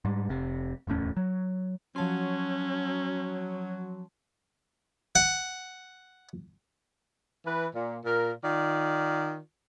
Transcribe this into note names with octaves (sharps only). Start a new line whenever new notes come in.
G#2 G3
F1 C3
D1 E2 A2 C#4
F#3
F3 F#3 C#4 A5 C6
F#5
E3 B4
A#2
A#2 A#4
D#3 F4 D5